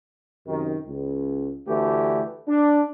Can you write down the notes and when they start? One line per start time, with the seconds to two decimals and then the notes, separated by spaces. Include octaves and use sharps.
0.47 F#2 C3 D#3
0.87 C#2
1.67 D2 D3 E3 A3 G4
2.48 D4